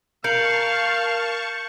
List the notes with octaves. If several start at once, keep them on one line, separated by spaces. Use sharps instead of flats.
A#4 F5 A5 C#6 G6 C#7 F#7